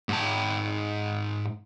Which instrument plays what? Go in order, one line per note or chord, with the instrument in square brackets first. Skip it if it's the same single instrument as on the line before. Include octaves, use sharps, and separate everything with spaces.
[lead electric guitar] G#2 A5